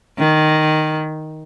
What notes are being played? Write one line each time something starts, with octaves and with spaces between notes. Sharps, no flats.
D#3